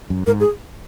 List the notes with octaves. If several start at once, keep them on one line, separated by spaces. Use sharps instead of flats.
F#2
G#2 A#4
G#4